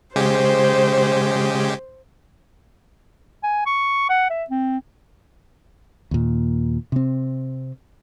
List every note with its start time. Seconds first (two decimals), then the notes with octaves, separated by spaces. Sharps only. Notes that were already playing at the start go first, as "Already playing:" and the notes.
0.16 C#3 G#3 G4 C5
3.44 G#5
3.66 C#6
4.09 F#5
4.30 E5
4.50 C4
6.11 D#2 A#2
6.92 C3 C4